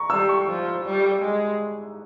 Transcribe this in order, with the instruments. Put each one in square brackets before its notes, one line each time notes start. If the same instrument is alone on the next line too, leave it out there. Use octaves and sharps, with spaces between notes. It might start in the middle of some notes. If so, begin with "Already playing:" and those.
Already playing: [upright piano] A#5 C#6
[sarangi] G3 [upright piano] E6
[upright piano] C#6
[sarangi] F3
G3
G#3